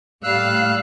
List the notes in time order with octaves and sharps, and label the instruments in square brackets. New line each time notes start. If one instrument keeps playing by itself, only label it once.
[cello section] A2 F5 [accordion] G3 E6 F#6